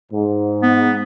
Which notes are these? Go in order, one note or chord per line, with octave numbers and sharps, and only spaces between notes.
G#2
B3